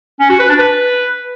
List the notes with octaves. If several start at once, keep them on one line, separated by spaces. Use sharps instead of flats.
C#4
F#4
B4
D4
B4